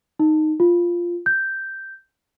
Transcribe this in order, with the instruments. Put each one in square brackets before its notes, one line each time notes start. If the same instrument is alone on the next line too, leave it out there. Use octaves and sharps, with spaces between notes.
[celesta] D#4
F4
G6